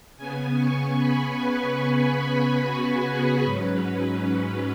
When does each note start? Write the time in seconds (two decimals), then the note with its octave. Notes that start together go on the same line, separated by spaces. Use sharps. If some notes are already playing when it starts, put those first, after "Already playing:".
0.17 C#3 B3 G#5
0.58 C#6
0.99 B5
1.41 B4
2.62 F#4
3.04 G#4
3.44 G#2 F#3 C#4 B4